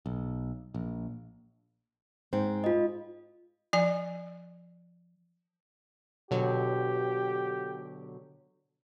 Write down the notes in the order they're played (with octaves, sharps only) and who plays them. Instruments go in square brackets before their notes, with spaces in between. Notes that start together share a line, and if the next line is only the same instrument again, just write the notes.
[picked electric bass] B1
A#1
[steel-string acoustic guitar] G#2 C4
[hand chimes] F4 D#5
[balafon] F3 D5 G#5
[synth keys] B2 D3 F#3 [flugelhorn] G4